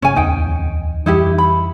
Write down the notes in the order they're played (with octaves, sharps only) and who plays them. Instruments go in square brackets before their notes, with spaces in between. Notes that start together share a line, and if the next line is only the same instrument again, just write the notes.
[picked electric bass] G1 C#3 [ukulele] C#4 G#5
[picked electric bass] D1 E2 C4 [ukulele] D#4 G5
[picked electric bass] F2 E3 G3 [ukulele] D#4 E4 G4
[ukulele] B5